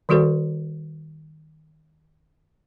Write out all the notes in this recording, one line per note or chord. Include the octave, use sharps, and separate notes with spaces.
D#3 G3 F#4 A4 C5 D5